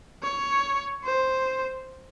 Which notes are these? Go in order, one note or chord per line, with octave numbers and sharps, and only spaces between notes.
C#5
C5